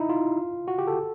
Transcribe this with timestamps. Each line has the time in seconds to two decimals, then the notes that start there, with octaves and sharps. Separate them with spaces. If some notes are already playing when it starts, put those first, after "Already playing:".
Already playing: D#4 E4
0.09 F4
0.68 F#4
0.78 G4
0.87 A4